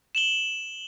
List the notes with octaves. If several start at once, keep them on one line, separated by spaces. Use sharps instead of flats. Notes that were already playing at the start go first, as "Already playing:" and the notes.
E7 F#7 G7